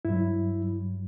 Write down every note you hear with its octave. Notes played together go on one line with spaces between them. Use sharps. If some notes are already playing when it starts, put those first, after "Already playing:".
G2 F#3 E4